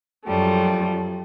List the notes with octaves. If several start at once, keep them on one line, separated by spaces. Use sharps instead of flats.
F#2 F3 G3 A3